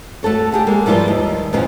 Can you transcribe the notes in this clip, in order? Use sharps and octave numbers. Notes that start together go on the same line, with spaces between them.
A3 F#4 A4 C#5
G4 G#4 F#5
G#3 A#3
F3 G3 E4 F4 B4
D#2
F2 A#2 B3 C#4 F4